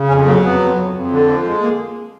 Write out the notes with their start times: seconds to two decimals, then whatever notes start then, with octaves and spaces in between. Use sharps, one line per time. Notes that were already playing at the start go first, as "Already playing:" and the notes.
Already playing: C#3
0.08 F2 C#4
0.25 F#3 A#3
0.42 F2 B3
0.60 F2
0.77 F2
0.94 F2
1.11 D3
1.27 F3
1.45 G#3
1.61 A#3